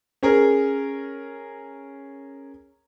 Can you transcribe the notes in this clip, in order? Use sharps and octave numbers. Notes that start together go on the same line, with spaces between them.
C#4 G#4 A#4